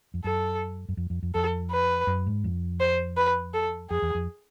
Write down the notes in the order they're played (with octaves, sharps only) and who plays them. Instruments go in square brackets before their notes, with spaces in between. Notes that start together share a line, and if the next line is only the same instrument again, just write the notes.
[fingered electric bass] F2
[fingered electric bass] F#2 [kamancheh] A4
[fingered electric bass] F#2
F2
F2
F2
[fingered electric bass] F2 [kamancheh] A4
[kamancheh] B4
[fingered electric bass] F#2
G#2
F2
[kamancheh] C5
B4
A4
[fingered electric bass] F2 [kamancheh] G#4
[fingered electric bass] E2
F2